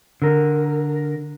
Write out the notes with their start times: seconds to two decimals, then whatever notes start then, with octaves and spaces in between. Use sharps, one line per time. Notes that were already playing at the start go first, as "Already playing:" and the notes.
0.22 D3 A#4